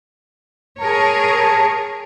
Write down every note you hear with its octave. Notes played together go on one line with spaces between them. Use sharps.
G#4 A#4 C#5 A5